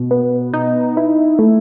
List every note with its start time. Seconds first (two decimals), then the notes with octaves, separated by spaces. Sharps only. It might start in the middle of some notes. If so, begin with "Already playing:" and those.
Already playing: B2
0.11 B3
0.53 D#4
0.97 E4
1.39 A3